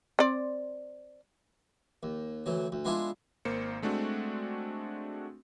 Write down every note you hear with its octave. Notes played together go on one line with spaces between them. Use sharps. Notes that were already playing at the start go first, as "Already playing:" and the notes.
C4 D5
D#2
D2 E3 F#3
D2
G#3 B3 D4 E4 F4 G#4
G#1 A#3 C5 C#7
G#3 A3 C4 D4 F#4